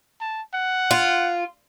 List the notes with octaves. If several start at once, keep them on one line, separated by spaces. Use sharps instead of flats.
A5
F#5
F4